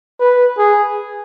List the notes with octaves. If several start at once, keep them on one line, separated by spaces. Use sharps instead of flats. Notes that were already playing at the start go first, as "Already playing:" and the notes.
B4
G#4